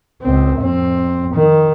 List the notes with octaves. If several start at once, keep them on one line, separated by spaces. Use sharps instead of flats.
C#2 C4
F2 C4
D#3